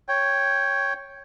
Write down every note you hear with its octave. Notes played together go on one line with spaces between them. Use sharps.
C#5 G5